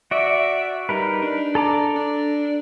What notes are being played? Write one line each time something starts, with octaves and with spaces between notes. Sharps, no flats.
F#4 D5 E5
G3 D#4 A#4 B4
D4
A4 A#5 D6
D4